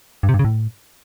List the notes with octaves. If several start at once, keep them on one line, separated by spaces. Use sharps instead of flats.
G2
C3
G2
C#3
A2